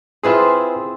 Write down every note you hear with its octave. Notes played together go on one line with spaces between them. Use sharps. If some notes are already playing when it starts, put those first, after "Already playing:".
C4 E4 F4 G#4 B4 E5